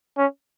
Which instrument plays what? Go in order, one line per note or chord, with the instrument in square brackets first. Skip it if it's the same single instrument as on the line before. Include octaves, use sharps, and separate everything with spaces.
[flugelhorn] C#4